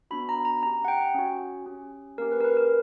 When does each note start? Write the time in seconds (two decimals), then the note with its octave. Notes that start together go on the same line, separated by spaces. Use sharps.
0.11 B3 D4 F#4 B5
0.29 A#5
0.45 A#5
0.62 C#4 A#5
0.66 G4
0.85 F#5
0.88 G5
1.15 C#4 F#4
1.66 C#4 G4
2.18 A#3 C#4 G4 A#4
2.32 B4
2.41 A#4
2.44 B4
2.57 A#4